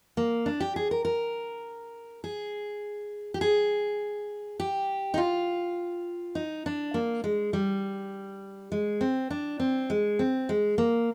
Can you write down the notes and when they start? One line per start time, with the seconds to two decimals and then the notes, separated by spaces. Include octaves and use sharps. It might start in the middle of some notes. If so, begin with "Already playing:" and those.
0.17 A#3
0.46 D4
0.60 G4
0.76 G#4
0.91 A#4
1.05 A#4
2.24 G#4
3.34 G4
3.41 G#4
4.60 G4
5.14 D#4
5.18 F4
6.35 D#4
6.66 D4
6.94 A#3
7.24 G#3
7.53 G3
8.72 G#3
9.01 C4
9.30 D4
9.60 C4
9.90 G#3
10.19 C4
10.49 G#3
10.78 A#3